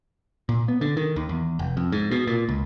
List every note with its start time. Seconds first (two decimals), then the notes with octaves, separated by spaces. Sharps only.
0.49 A#2
0.68 B3
0.81 D3
0.97 D#3
1.16 D#2
1.29 E2
1.59 F1
1.77 F2
1.92 G#2
2.11 B2
2.27 A#2
2.49 C#2